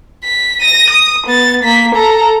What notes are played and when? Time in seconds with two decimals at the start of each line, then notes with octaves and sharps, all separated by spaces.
0.24 B6
0.61 A#6 D#7
0.90 D#6
1.27 B3 A6
1.63 A#3 B6
1.95 A4 A#5